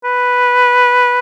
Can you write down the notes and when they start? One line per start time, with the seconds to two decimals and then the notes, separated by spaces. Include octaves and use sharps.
0.04 B4